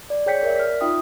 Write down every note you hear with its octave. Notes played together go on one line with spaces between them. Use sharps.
D5
G#4 C#5 G5 G6 B6 C#7
A#4 D5 E5
F6 B6
D#4 F4 E5 G5 D#6